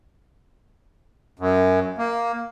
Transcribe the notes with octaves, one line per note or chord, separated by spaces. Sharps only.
F#2
A#3